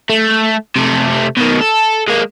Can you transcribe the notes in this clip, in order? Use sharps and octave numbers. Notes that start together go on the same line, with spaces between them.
A3
C3 A3
B2 D#3
A4
G#3 A#3